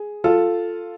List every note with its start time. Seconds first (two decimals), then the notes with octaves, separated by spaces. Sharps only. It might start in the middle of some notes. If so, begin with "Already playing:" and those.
Already playing: G#4
0.24 F4 A4